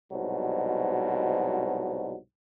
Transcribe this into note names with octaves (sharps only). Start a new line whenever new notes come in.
C2 G#2 B2 F#3